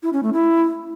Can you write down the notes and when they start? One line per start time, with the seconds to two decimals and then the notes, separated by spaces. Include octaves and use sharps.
0.03 E4
0.13 C#4
0.23 A3
0.33 E4